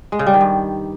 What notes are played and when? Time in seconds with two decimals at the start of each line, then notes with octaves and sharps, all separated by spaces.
0.12 G#3
0.19 C#3
0.26 G3
0.34 D#3
0.41 G2